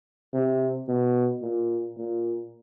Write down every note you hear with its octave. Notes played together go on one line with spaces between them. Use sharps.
C3
B2
A#2
A#2